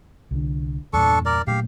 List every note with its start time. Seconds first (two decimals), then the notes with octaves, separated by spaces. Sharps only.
0.31 C2 D3
0.93 E2 G2 A#2 D4 A4 C#6
1.25 A#4 D5
1.47 A#2 F#3 A3 G4 F5